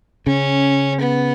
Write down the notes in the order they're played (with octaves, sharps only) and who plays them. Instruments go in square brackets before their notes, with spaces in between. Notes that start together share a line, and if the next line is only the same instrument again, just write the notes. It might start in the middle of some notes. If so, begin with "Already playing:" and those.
[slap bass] C#3 [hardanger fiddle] C#4
[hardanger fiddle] B3